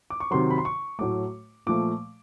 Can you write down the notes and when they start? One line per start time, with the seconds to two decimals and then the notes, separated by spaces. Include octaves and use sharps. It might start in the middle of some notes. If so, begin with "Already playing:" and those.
0.10 D6
0.20 C#6
0.31 C3 D#3 F#3 C6
0.51 B5
0.58 C6
0.65 C#6
0.99 A2 F#3 A3 D6
1.67 A#2 F3 A3 D6